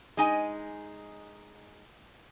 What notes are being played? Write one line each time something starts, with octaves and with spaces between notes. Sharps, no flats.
G#3 D#4 G#5